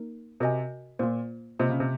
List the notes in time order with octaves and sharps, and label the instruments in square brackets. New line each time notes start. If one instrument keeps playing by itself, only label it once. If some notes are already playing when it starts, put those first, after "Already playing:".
Already playing: [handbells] A#3 D#4 A#4
[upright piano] C3 [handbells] F#4 A#4 D#5 G#5
[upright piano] A#2 [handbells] A#3 F4 C5
[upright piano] C3 [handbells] A#3 F4 C5 D#5
[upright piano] C#3
C3